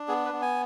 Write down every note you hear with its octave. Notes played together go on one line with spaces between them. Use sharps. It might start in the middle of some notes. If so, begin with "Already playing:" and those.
Already playing: D4
B3 G#4
B4
B3
G#5